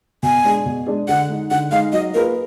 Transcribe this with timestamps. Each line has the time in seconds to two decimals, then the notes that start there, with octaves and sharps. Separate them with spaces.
0.23 B2 G#5
0.45 G#3 D4 G#4
0.66 B2
0.87 G#3 D4 G#4
1.08 D3 F#5
1.29 G#3 D#4
1.50 D3 F#5
1.71 G#3 D#4 F5
1.92 F#3 D#5
2.14 A#3 F4 G#4 A#4 B4